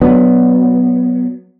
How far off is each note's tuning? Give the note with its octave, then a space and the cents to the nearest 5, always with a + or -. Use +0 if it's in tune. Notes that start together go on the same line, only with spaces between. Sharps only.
F#3 +0 B3 +0 D4 +0